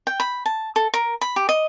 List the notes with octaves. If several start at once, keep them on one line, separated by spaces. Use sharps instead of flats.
G5
B5
A5
A4
A#4
B5
G4
D#5